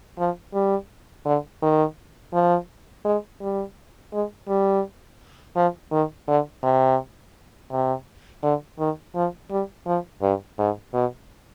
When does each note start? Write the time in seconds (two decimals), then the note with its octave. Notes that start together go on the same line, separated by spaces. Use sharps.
0.19 F3
0.54 G3
1.25 D3
1.62 D#3
2.34 F3
3.05 G#3
3.41 G3
4.13 G#3
4.48 G3
5.56 F3
5.92 D#3
6.28 D3
6.63 C3
7.71 C3
8.43 D3
8.79 D#3
9.15 F3
9.50 G3
9.86 F3
10.22 G2
10.59 G#2
10.94 B2